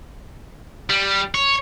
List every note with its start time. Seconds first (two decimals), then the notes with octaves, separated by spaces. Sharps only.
0.90 G3
1.34 C#5